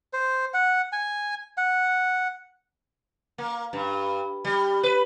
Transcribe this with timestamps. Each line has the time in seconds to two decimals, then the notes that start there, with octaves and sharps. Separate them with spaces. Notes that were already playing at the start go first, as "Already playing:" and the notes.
0.13 C5
0.54 F#5
0.93 G#5
1.57 F#5
3.38 A#3
3.73 G2
4.45 G3
4.83 B4